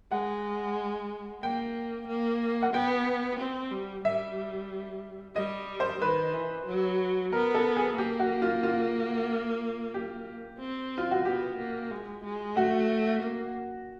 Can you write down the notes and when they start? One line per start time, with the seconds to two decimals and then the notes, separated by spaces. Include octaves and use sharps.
0.12 G#3 F#5
1.43 A#3 G5
2.08 A#3
2.63 F#5
2.74 B3 G5
3.39 C4
3.71 G3
4.05 G3 E5
5.35 G3 D#5
5.80 C5
6.01 D#3 B4
6.34 E3
6.67 F#3
7.32 B3 A#4
7.54 A4
7.76 G#4
7.97 A#3 G4
8.20 F#4
8.42 F4
8.63 F4
9.94 G4
10.60 C4
10.98 F4
11.11 F#4
11.25 B3 G4
11.59 A#3
11.91 G#3
12.24 G#3
12.56 A3 F#4
13.22 A#3